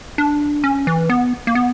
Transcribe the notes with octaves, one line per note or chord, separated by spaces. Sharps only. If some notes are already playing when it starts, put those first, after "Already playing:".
D4
C#4
E3
B3
A#3
B3